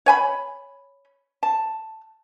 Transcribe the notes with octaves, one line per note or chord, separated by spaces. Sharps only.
C#5 G#5 B5
A5